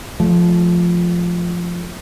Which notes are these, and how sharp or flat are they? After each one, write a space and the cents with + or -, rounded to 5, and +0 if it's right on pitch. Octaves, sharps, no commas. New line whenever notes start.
F3 +0 A3 -30